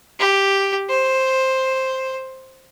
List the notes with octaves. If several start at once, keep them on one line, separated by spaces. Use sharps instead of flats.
G4
C5